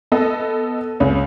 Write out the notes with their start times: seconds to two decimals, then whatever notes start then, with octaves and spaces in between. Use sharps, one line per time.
0.12 B3 A4 D#5
1.00 C#2 C#4